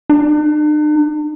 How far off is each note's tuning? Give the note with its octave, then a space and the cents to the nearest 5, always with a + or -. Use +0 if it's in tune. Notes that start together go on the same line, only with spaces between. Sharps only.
D4 +45